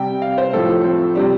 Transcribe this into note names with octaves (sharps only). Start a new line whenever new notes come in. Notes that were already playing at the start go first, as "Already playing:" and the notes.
Already playing: C3 G3 G5
F5
C5
A2 F3 A4
C4
C3 G3 D4